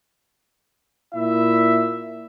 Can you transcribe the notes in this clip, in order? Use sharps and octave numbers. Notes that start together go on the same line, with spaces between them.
A#2 E4 E5